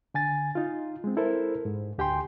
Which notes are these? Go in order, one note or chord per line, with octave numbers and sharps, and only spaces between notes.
D3 G#5 A6
D#4 F4
G#3 C4
E4 A4 A#4 C5
G#2
D2 G4 G5 G#5 C6